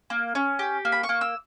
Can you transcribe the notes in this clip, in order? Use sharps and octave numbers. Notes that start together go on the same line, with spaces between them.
A#3
C#4
G4
A#3
B5
C#6
A#3
E6